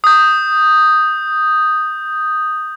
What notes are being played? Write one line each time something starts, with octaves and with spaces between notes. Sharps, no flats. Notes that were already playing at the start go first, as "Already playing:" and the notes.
D#6 G6